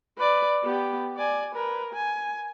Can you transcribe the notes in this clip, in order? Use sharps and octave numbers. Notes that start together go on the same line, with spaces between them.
B4 D5
B3 G4
D5 G#5
A#4 B4
G#5